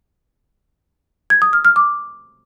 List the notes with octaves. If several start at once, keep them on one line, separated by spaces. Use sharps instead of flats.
G#6
D#6
F6
F6
D6